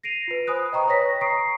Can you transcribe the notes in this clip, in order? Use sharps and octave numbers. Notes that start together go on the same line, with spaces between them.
A#6 C7 D7 D#7 F7
F4 B4
C5 G#5 B5 D#6 F#6
D#5 G5 A#5 C#6 D#6
B4 C#5 G5 A#6 B6
A#5 C#6 D#6 C7 D7